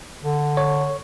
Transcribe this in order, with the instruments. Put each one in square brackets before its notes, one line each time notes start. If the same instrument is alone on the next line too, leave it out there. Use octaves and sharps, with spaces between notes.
[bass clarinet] D3
[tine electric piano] C#5